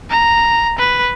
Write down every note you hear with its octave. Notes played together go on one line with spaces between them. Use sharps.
A#5
B4